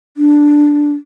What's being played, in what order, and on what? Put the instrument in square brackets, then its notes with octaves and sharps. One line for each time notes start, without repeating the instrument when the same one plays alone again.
[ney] D4